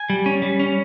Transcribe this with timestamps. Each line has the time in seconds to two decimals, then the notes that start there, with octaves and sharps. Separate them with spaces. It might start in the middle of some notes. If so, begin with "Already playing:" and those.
Already playing: G#5
0.10 G3
0.26 C#4
0.42 G3
0.60 C#4